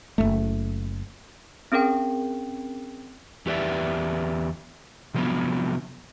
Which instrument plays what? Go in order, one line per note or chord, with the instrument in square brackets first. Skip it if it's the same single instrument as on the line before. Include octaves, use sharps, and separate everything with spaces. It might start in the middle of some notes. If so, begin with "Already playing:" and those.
[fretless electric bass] F#1 C#2 A3
[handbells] C4 C#4 G#4 A#4 G5
[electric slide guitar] E2 G4 B4 D5 E5
C3 F3 F#3 B3